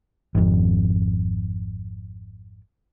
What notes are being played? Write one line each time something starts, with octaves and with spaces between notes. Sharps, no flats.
G#1 F2